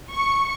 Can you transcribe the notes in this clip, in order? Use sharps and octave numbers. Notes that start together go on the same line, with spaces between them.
C#6